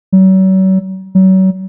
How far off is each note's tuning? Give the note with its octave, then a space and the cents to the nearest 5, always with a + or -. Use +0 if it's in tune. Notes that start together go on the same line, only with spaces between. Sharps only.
F#3 +40
F#3 +35